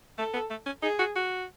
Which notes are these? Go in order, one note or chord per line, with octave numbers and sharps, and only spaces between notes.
A3 A4
B3
A3
C#4
D#4 G#4
F#4
F#4